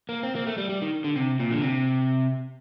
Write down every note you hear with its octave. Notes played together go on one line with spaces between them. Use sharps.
A#3
C4
A#3
A3
G3
G3
D#3
D3
C3
A#2
D3
C3